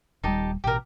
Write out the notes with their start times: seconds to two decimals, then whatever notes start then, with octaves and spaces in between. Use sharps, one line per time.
0.24 D#1 G3 D#4 G4 A5
0.64 A1 B2 G4 A#4